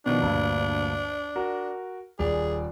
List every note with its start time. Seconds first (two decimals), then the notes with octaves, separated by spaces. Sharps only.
0.06 B2 D#3 F3 D4
0.21 D2 G2 A#2
1.36 F#4 A#4
2.19 D#1 G#4 D5